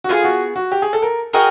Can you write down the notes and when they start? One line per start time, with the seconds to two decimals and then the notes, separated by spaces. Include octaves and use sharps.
0.04 F#4
0.09 B3 E4 F4 G#4
0.24 F#4
0.56 F#4
0.72 G4
0.82 G#4
0.93 A4
1.02 A#4
1.33 F#4 G#4 A#4 D#5 G5